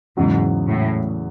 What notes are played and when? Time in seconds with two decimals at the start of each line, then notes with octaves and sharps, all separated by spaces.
0.17 E2 G#2 C#3 F#3
0.67 A2